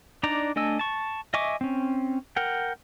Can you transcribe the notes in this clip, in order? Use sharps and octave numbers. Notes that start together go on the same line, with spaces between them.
D4 D#4 D5 A#5
A3 D4 D#5 G#5 E6
A5 C#6
D#5 E5 G#5 C#6 D6
C4 C#4
A#4 F#5 G5